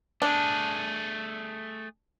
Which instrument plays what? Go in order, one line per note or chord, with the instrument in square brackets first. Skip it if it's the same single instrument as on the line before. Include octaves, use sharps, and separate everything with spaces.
[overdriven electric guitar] A3 G#4 [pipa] D4